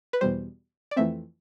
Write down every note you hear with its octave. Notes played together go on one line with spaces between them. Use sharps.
B4
E2 B2 G3 C5
D5
F2 E3 A3 C4 E5